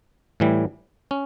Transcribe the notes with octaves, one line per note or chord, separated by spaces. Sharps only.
A2 E3 G3
C#4